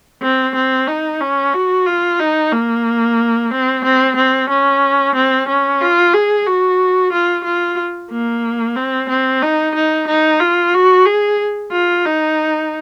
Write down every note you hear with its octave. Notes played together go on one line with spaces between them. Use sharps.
C4
C4
D#4
C#4
F#4
F4
D#4
A#3
C4
C4
C4
C#4
C4
C#4
F4
G#4
F#4
F4
F4
A#3
C4
C4
D#4
D#4
D#4
F4
F#4
G#4
F4
D#4